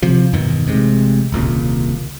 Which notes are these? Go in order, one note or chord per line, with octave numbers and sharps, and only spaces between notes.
C3 F3
E2 G2 B2 D#3
A1 C3 G#3
D#1 C2 A#2 C#3